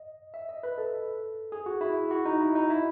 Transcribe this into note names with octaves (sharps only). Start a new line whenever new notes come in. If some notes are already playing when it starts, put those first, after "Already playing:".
Already playing: D#5
E5
D#5
B4
A4
G#4
F#4
E4
F#4
D#4
E4
D#4
E4